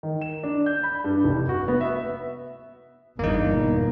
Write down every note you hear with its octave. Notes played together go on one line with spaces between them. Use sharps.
D#3
E7
D4
G6
B5
G2
F1
F#4
B3
E5
G1 E2 G2 A#3 D#4
B2